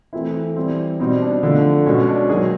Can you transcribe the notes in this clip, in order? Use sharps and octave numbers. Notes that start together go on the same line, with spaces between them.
E3 A3 C4 E4
E3 G3 C4
B2 G3 C4 D#4
D4
D3 F3 A3
B2 G#3 B3 C#4
D4
D#3 F#3 A#3 G#4